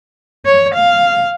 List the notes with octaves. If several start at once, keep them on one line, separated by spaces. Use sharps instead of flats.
C#5
F5